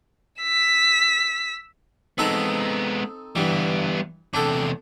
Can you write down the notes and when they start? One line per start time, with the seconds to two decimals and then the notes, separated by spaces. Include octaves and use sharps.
0.41 E6 B6
2.18 G#3 B3 C4 D#4 A4
3.36 G2 E3 G3 B3
4.34 E2 C3 D4 A4